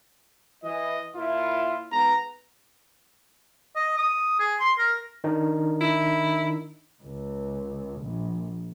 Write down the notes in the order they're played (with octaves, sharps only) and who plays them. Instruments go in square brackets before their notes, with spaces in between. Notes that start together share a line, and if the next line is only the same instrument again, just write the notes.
[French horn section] E3 [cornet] D#5
[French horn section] A#2 E4 [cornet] F4
[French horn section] G#2 B3 [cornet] A#5
[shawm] D#5
D#6
G#4
C6
A#4
[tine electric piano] D#3 D4 D#4
[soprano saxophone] E4
[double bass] C#2
A#1